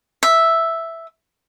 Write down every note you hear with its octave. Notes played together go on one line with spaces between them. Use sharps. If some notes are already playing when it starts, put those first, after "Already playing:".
E5